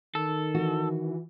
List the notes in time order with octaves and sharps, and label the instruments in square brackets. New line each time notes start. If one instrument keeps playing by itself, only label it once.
[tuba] D#3 [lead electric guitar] A4
[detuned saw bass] E3 [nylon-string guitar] F#4